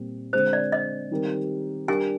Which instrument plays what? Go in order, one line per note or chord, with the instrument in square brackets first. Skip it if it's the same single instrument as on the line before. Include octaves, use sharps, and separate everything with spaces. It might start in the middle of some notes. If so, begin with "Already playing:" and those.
Already playing: [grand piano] A#2 G3 C4
[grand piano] D3 G#3 C4 [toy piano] C5
[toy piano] D5
D#5
[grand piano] D#3 G3 C4 G4 A#4
[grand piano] G3 D4 G4 A#4 [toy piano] G#5